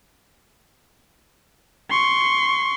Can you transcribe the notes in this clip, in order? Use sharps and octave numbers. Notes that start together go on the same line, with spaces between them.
C6 C#6